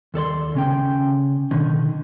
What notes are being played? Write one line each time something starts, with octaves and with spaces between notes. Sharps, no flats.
D#2 A4 D5 C6
C#3 C#4 G5
B2 D3 D#3